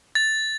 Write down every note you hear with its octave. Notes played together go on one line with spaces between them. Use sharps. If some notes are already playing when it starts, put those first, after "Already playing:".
A6